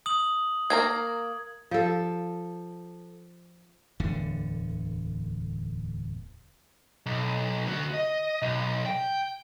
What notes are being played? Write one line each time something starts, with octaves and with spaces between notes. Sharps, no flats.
D#6 F#7
A#3 A#4 A#5 G#6
F3 A4
D1 E2 D3
B1
D3 F#4
D#5
B1
G5